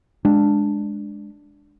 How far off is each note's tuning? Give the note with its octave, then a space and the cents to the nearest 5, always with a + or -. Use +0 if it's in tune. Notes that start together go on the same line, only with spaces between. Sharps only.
G#3 +0 D4 +0